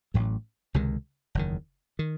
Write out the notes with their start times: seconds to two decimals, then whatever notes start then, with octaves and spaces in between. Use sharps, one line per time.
0.14 A1 A2 F#3
0.74 C#2 C3 D#3 G#3
1.35 F#1 E2 D#3
1.99 D#3